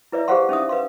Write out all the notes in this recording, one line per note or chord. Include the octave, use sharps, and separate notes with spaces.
E4 B4 D5 E5
G4 G#4 C5 F5 F#5 C6
C#4 D#4 E5 D#6
B4 F5 C6